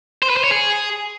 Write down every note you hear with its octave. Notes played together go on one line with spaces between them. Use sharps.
C5
B4
C5
C#5
G#4